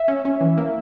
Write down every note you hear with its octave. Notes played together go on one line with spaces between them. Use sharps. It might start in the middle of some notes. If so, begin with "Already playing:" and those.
Already playing: E5
C#4
C#4
E3
A#3